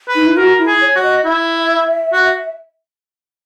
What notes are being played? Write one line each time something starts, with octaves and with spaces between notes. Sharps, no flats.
B4
D#4
E4
F#4 A#4
E4
G#4
C#5
F#4
D#5
E4 E5
F#4